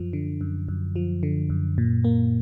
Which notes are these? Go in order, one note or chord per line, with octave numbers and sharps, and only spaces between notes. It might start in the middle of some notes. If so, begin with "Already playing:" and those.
Already playing: F#2 F3
D3
F#2
F#2
F3
D3
F#2
A#2
A#3